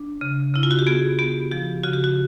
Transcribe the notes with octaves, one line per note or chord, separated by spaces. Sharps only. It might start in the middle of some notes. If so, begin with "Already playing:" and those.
Already playing: D4
C#3
C#3 E4
F4
F#4
G4
B3 G#4
B3 G4
F3 G4
C#3 F#4
G4
F#4